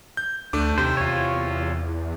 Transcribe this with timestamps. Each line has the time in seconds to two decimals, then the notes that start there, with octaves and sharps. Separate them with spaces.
0.17 G6
0.53 D2 A3 D4 D6
0.78 D#2 C3 C5
0.97 E2 F4 C#5